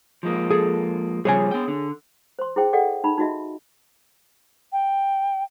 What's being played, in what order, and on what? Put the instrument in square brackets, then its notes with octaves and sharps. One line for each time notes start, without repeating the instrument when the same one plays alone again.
[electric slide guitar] F3 G#3 A#3
[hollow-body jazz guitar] G#4 A4
[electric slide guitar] C#3 F3 G3 [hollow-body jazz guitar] G#4 C#5 G#5
[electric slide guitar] B3 G5
D3
[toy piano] C5 C6
E4 G#4 C5 G5
G#4 A4 D5 D#5 F#5 G5
D#4 B5
D#4 F4 F#4 D#5 E5
[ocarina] G5